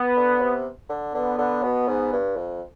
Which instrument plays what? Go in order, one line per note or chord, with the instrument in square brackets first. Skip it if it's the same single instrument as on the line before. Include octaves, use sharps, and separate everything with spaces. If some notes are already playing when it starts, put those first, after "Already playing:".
Already playing: [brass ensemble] B3
[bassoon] D3
C3
D3
[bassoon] D3 [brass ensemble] B3
[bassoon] D3
B2
G#2
G2
F2